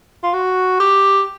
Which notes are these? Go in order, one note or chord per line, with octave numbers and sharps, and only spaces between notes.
F4
F#4
G4